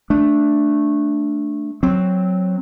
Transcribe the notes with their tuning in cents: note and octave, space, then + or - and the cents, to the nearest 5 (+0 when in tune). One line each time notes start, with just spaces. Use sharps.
A3 +0 D4 +0
F#3 +0 C4 +0